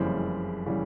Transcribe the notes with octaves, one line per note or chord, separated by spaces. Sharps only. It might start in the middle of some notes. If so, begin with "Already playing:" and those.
Already playing: F#1 F2 C#3 E3 G3 C5
C#3 E3 G3